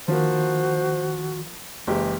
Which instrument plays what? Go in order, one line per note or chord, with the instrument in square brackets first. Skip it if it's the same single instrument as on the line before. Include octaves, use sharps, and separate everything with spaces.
[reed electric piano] D#3 [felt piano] F3 A#3 [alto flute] F#4 [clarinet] C5
[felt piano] F#1 G#3 G4 [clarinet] E3